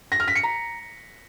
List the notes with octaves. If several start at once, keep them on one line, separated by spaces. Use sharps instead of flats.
A#6
F6
B6
C#7
A#5